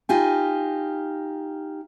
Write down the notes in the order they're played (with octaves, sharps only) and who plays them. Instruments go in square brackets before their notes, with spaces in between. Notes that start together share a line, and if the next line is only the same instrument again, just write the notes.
[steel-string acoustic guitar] D#4 F4 G4 G#5